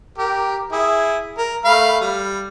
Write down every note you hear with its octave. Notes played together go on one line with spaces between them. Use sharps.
G4 A#4
E4 G#4
A#4
A3 F5 B5
G3